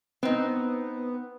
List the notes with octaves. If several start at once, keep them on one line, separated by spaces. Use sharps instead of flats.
B3 C4 D#4